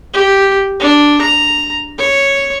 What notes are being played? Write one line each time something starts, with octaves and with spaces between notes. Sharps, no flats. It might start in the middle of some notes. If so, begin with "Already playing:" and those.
G4
D4
A#5
C#5